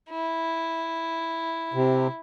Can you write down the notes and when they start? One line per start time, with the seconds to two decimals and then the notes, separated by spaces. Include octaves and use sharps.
0.10 E4
1.74 C3